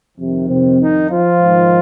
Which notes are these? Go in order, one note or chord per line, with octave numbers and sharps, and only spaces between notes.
F2 C3 D#3
C3 C4
D#3 D#4
F3 F4
G#2 D#3